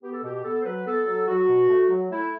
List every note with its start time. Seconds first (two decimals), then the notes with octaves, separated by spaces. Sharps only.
0.02 B3 G4
0.13 A4
0.23 B2 G4
0.34 G4
0.44 B3 A4
0.60 C5
0.65 F#3 B4
0.86 B3 A4
1.07 F#3
1.28 F#3 F#4
1.48 B2
1.69 A3
1.90 F#3
2.11 A3 E4